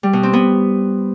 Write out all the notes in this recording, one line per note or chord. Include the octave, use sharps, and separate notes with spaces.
G3
B2
C4
B3